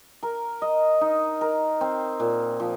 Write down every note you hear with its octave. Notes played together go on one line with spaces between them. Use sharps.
A#4
D#5
D#4
A#4
C4
A#2
F3